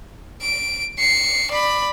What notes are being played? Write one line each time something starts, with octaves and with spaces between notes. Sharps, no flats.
D7
C7 C#7
D5 B5